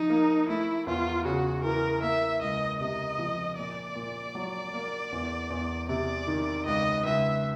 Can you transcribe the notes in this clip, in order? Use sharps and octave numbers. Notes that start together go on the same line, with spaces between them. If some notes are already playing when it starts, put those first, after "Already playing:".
Already playing: F3 D#4
A#3
A3 E4
E2 F4
C#3 F#4
E3 A#4
A#3 E5
C#2 D#5
C3 D#5
F3
A#2 D5
A#2
F#3
A#3
E2
E2
C3 D5
D#3
C#2 D#5
C#2 E5